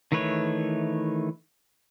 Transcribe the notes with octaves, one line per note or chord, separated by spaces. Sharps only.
D#3 E3 A3 B4 C#5